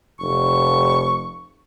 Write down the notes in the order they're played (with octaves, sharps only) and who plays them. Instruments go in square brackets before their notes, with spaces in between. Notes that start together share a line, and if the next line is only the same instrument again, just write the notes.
[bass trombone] F1 [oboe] C#6